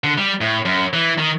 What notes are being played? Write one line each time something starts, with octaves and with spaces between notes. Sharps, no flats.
D3
G3
A2
F#2
E3
D#3